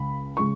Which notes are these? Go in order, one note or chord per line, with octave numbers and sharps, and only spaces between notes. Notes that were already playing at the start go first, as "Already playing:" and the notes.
Already playing: C#2 C#3 G#3 B5
C#3 G#3 C#6